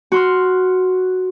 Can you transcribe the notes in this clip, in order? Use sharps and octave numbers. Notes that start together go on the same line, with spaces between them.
F#4 C6 F6